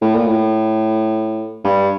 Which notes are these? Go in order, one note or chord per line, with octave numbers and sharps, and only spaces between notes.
A2
A#2
A2
G2